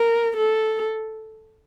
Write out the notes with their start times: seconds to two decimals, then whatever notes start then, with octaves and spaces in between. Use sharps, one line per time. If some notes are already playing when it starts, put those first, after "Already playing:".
Already playing: A#4
0.37 A4